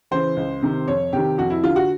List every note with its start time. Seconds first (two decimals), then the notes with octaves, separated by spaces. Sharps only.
0.11 C#3 E3 C5
0.37 C#2
0.62 C3 D#3
0.88 F2 C#5
1.12 C3 D#3 G4
1.38 F2 F#4
1.50 E4
1.64 D3 F4
1.76 F#4